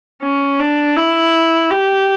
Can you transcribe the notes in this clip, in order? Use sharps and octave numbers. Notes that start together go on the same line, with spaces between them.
C#4
D4
E4
G4